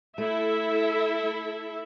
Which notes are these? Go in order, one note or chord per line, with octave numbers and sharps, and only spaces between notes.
A3 E4 A4 E5